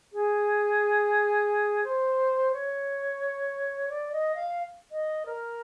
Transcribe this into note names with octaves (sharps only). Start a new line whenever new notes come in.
G#4
C5
C#5
D5
D#5
F5
D#5
A#4